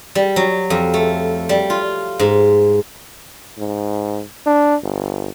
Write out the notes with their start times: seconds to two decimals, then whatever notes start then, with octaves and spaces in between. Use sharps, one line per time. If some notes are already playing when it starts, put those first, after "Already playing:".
0.15 G3
0.36 F#3
0.70 F2
0.94 A3
1.49 G3
1.70 F4
2.19 G#2
3.58 G#2
4.46 D4
4.84 G1